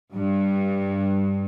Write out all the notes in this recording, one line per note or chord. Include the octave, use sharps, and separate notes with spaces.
G2